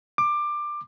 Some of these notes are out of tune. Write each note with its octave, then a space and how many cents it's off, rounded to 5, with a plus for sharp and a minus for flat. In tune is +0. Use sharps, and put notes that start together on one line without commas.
D6 +20